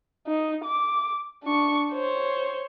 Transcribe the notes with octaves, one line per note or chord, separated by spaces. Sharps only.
D#4
D6
D4 C#6
C5 C#5